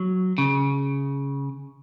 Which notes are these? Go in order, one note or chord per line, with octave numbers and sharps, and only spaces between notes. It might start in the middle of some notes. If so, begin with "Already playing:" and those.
Already playing: F#3
C#3